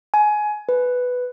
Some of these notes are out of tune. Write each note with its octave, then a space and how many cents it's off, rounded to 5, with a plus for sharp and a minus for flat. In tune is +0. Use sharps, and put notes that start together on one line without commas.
G#5 +20
B4 +5